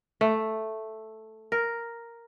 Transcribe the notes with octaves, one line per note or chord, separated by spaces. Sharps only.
A3
A#4